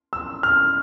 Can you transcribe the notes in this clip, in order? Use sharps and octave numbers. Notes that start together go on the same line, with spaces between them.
E6
F6